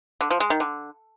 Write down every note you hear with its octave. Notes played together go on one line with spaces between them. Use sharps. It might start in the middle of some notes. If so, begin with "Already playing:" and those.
D3
F3
G#3
D#3
D3